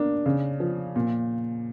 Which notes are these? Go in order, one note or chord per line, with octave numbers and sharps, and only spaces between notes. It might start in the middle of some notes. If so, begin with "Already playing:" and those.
Already playing: A#3 D4
C#3
F3
A#2